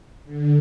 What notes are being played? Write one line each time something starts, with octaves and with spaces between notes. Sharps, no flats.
D3